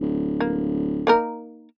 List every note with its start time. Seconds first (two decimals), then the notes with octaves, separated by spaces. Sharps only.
0.01 D1
0.40 A#3
1.07 A#3 D#4 A#4